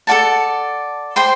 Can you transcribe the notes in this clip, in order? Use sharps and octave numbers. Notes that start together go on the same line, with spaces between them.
A4 D5 F#5 A5
C5 G5 C6